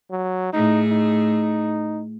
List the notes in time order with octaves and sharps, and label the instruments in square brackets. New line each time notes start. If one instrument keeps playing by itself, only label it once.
[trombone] F#3
[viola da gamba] A2 A3 G#4 [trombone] D#4
[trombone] D#4